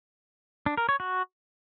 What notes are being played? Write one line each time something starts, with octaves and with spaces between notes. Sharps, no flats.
D4
A#4
C#5
F#4